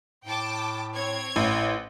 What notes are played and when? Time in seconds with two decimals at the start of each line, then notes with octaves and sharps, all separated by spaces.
0.25 A2 G5 A5 D6
0.94 C4 C#5 G#6
1.36 A1 A2 E4